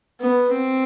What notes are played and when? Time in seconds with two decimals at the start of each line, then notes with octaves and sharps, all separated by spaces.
0.21 B3
0.52 C4